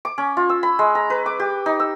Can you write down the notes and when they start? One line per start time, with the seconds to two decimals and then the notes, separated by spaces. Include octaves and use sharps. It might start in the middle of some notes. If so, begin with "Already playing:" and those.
0.05 D6
0.18 C#4
0.37 F4
0.49 E6
0.63 B5
0.79 G#3
0.95 A#5
1.10 B4
1.26 D6
1.40 G4
1.66 D#4
1.80 E6